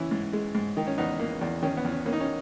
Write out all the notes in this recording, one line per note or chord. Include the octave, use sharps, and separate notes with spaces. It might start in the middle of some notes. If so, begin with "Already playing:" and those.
Already playing: E3 C#4 E4
G#2
G#3
G#2
D#3 D#4
C#4
E2 B3 D#4
A#3
E2
D#3 C#4
B3
E2
C#4
A#3 C#4
D#4
C#4